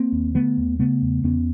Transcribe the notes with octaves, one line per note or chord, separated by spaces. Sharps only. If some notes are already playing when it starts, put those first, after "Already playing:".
Already playing: A#3 C4
D#2
D3 A3 B3
D#2
C#3 A3 B3
E2
E2 B3 C#4